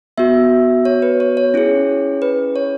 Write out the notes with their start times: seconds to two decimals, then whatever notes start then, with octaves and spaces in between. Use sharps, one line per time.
0.18 B3 F#4 E5
0.85 C#5
1.02 B4
1.20 C#5
1.37 C#5
1.54 C#4 E4 G#4
2.22 B4
2.56 C#5